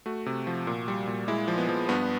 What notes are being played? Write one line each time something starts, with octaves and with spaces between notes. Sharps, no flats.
A3 F#4
C3
F3
A#2
G3
A#2
G#3 E4
F3
B3
F3
G2 B3